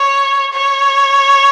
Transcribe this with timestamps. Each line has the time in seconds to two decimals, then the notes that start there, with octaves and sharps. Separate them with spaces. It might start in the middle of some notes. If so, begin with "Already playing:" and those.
Already playing: C#5
0.53 C#5